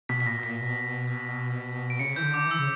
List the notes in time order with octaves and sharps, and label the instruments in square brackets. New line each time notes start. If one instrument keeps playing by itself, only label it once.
[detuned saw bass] B2 [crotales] B6
[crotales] B6
[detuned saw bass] A#2 [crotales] A#6
[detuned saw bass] B2
[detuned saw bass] A#2 [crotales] B6
[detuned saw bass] B2
[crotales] D7
[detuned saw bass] C#3 [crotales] C#7
[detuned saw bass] E3 [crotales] G6
[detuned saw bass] D3
[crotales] D6
[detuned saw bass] E3
[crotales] E6
[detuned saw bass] C#3